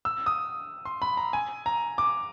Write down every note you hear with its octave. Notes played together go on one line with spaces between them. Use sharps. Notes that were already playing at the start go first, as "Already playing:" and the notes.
E6
D#6
C6
B5
A#5
G#5
A#5
D6